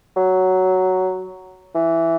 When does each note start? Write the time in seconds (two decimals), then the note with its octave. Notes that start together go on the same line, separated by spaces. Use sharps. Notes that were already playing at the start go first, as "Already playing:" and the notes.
0.17 F#3
1.75 E3